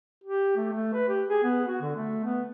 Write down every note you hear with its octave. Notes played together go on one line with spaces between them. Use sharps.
G4
A3
A3
B4
G4
G#4
B3
F#4
D3
A3
B3